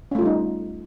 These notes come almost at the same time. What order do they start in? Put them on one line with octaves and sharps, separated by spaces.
C#4 A3 F4 G3 D#4